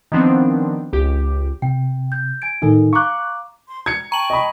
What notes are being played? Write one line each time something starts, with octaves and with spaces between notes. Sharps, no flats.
D#3 F3 B3 C4 D4
C#2 G4
C3 G5
G6
G#5 G#6 D7
A2 D#3 D#4 A4 A#4 G#5
F5 A#5 C#6 D6 F#6
C6
A#5 G#6 C#7
G5 A5 A#5 C#6 F#7
D#5 B5